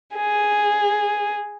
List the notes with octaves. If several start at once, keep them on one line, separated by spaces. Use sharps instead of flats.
G#4